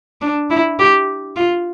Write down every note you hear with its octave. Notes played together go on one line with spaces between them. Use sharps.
D4
E4
G4
F4